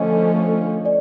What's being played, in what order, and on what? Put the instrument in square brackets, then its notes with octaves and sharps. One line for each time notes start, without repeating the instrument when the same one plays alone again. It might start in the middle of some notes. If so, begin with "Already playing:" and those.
Already playing: [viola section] D3 F3 A3 C#4 [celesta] D#5
[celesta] D5